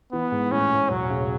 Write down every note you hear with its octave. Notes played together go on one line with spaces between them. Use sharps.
E3 B3
G#2
A2 C#4
A2
E1 F#3
C#3